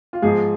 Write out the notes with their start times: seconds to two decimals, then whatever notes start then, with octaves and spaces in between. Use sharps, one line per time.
0.13 F4
0.22 G#2 F3 G#4